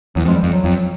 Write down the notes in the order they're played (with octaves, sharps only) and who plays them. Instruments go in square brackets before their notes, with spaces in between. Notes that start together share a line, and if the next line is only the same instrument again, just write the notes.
[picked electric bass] E2 [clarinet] F#3
[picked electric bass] F2 [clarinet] G#3
[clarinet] G3
[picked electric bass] F2
[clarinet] F#3
[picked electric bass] F2